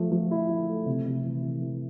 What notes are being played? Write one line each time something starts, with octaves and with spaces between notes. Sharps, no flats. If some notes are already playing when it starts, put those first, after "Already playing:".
Already playing: F3 A3
F3
E4
E4
A3
C3
C3
E3
E3
E3